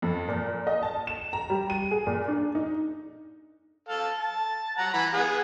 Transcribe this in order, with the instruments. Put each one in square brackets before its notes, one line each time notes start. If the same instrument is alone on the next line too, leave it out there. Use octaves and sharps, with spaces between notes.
[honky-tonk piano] F2
A#2
D#5
A5
E7
A#5
G3
D#7
G#4
A#2
D4
D#4
[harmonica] A4 F5
A5
F#5 A#5
E3 B5
B3 G#4 F#5